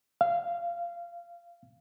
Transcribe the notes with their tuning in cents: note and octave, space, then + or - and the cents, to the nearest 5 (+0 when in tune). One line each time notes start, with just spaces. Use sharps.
F5 -20